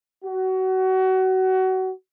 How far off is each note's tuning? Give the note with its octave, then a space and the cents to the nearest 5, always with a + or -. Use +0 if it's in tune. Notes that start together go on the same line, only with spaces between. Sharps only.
F#4 +25